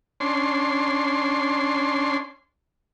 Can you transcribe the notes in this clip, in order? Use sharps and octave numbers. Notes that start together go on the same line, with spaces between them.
C#4 D4 C6